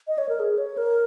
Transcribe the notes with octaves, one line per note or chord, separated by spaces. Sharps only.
D#5
C#5
A#4
G#4
C#5
A#4